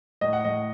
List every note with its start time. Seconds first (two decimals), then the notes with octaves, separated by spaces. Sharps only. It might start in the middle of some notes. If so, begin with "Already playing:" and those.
0.21 A2 D#5
0.33 F#5
0.45 A2 D#5